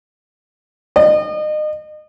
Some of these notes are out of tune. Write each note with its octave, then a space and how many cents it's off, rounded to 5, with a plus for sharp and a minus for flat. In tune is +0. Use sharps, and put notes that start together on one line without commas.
D#5 -35